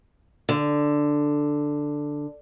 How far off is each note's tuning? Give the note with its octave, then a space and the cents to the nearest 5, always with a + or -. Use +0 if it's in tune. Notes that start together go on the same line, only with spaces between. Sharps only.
D3 +5